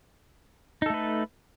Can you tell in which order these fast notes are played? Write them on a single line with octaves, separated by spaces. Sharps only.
D#4 A4 A3 B4